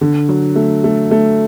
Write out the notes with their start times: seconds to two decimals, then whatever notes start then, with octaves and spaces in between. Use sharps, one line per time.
0.01 D3
0.29 F#3
0.56 A3
0.84 A3
1.11 A3